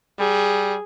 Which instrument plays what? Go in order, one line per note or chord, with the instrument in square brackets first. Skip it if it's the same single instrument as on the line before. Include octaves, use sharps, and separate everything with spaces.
[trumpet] G3 [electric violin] G#4